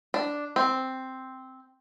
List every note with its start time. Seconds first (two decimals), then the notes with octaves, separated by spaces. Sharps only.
0.14 D4
0.56 C4